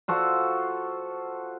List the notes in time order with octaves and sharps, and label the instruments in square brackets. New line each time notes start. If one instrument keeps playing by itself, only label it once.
[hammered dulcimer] F4 F#4 A4 C5